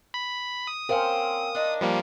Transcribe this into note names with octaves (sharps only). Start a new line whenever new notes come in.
B5
D#6
C4 C#4 A#4 C5 F5
D4 D#4
F3 G3 A#3